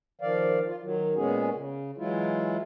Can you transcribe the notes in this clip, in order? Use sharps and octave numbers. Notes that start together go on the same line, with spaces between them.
D#3 F3 D5 F5
F4
D#3 F#3
A#2 G#3 B3 C#4 G#4
C#3
E3 F#3 G#3 E4 F4